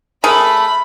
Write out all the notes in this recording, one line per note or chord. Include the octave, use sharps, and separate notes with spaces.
A3 G#4 A#4 B5